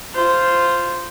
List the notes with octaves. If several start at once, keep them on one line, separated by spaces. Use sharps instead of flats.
F4 C5